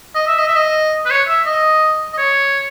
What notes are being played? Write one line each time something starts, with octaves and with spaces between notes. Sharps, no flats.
D#5
E5
D#5
E5
D#5
B4
C#5
E5
D#5
D#5
C#5